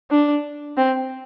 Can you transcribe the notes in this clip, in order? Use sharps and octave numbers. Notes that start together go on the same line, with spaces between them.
D4
C4